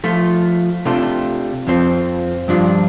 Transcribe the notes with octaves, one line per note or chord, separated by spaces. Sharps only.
F3 A3 F4
C3 A3 D4 F4
F2 F3 C4
G2 F3 D4 F4